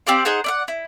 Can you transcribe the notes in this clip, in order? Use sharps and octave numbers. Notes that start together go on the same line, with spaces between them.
C4 G4 D5 F5
D#4 G#4 C5 F#5
D5 E5 F#5
E4